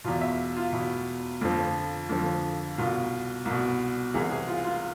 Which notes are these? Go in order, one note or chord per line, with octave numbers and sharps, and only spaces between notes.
E2 B2 F4
E5
F4
E2 B2 E4
F2 D3 F3
F2 D3 F3
C2 B2 F4
C2 B2
C2 C3 E3 G#4
G#4
F4
F4